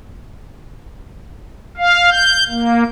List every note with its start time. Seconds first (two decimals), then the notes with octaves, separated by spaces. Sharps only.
1.77 F5
2.11 G6
2.49 A#3